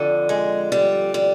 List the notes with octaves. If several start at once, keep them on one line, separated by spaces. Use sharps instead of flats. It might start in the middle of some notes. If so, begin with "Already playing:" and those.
Already playing: F2 D3
G#3
G3
G3